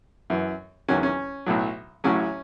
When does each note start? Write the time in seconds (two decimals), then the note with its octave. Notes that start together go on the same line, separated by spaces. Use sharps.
0.30 F#2 E3
0.88 E2 D#3 F#3 C#4
1.03 C#4
1.46 B1 A2 F#3
2.04 A1 A2 F#3 C#4